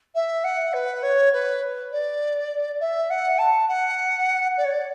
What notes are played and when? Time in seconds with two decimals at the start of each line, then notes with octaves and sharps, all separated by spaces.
0.15 E5
0.44 F#5
0.73 B4
1.02 C#5
1.33 B4
1.92 D5
2.80 E5
3.10 F#5
3.38 A5
3.68 F#5
4.57 D5
4.64 C#5
4.71 D5